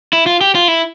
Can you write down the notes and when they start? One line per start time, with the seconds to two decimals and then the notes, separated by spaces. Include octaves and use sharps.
0.13 E4
0.26 F4
0.41 G4
0.55 F4
0.68 E4